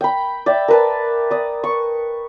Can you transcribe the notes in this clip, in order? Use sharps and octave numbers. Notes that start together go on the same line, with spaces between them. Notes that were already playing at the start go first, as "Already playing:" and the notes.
G5 B5
D5 E5 G5
A#4 B4 A5
D5 D#6
C#6